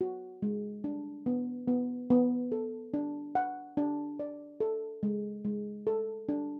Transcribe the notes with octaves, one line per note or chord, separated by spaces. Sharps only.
F#4
G#3
D4
B3
B3
B3
A4
D4
F#5
D4
D5
A4
G#3
G#3
A4
D4